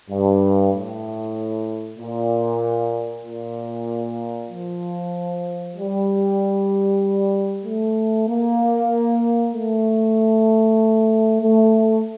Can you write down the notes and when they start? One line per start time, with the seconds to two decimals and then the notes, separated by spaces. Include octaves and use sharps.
0.10 G2
0.73 A2
1.99 A#2
3.24 A#2
4.51 F3
5.76 G3
7.65 A3
8.28 A#3
9.54 A3
11.42 A3